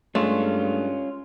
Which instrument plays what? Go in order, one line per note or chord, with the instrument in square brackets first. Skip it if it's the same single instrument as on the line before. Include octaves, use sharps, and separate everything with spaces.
[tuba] G2 [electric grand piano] G#3 [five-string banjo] A3 [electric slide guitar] C#4 F4